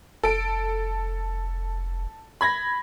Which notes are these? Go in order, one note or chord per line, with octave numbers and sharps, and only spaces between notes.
F1 A4 D7
B5 G#6 A#6